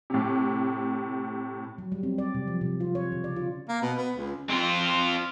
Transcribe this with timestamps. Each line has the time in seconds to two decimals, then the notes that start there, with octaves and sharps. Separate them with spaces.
0.10 A2 C3
1.78 F#3
1.92 G3
2.03 C4
2.18 D5
2.34 C3
2.47 F3
2.61 C3
2.80 F4
2.95 C#5
3.12 C#3
3.24 D5
3.36 F4
3.69 A#3
3.82 B2
3.98 B3
4.17 C#2
4.50 C4 F4